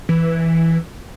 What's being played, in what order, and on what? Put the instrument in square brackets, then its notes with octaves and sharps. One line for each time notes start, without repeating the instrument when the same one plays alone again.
[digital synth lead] E3